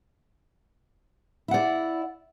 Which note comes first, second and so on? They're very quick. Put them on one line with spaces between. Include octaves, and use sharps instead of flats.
E4 F#5 D5